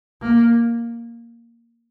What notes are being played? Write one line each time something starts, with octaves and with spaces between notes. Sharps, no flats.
A#3